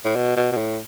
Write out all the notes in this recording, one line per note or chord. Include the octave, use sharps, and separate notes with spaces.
A2
B2
B2
B2
A2